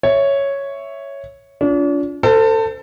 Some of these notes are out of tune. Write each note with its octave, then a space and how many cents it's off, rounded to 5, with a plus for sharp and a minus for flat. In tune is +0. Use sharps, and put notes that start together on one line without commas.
C#5 +0 E5 +0
D4 -40 F4 +0
A4 +25 C5 -25